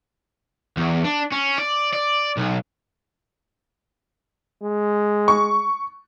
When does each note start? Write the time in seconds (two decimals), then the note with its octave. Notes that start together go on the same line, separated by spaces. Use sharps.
0.77 E2
1.04 D4
1.32 C#4
1.58 D5
1.93 D5
2.37 B1
4.63 G#3
5.28 C#6